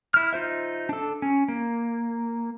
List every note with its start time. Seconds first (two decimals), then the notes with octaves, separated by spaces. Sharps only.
0.14 E4 F6
0.33 D#4 F4 C5 E5
0.89 D4 A4
1.22 C#4
1.48 A#3